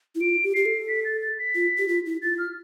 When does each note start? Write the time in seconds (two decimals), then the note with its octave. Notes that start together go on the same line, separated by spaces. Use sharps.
0.15 E4
0.21 F4 D7
0.44 G4
0.54 G4 C7
0.66 A4
0.89 B6
1.05 A6
1.22 A6
1.39 B6
1.55 F4
1.78 G4
1.88 F4
2.06 E4
2.22 F4 A6
2.38 F6